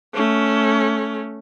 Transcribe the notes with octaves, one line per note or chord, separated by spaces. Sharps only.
A3 C#4